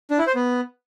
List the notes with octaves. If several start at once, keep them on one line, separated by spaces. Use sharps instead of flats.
D4
E4
C5
B3